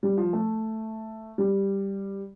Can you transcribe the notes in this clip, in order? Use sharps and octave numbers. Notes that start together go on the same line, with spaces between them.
G3
F3
A3
G3